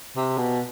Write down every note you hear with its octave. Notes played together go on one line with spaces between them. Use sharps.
C3
B2